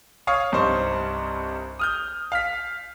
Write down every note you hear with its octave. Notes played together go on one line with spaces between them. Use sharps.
C#5 F5 C#6 D#6
C2 G2 D#4 C5 C#6
D#6 F6 G6
F5 F6 B6